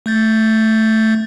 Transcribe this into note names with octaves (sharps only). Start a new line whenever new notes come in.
A3 G6 A6